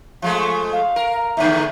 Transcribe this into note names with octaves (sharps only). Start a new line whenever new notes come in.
F3 G#3 A3 F5
C#6
F5
A#4
E2 A2 D3 E5